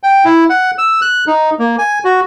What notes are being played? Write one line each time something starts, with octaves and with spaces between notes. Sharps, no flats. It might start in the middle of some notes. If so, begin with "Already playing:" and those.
G5
E4
F#5
E6
F#6
D#4
A#3
G#5
F#4